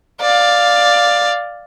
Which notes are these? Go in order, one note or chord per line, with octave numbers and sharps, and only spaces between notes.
D5 F5